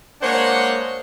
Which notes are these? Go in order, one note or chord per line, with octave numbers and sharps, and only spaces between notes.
G#3 A#3 D4 C5 C#5 F#5